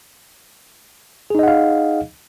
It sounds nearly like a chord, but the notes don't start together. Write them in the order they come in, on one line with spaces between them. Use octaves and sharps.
G#4 D#4 D#5 F#5 F5